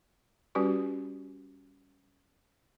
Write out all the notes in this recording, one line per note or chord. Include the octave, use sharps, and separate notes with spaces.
G3 C#4 F#4 G4 B4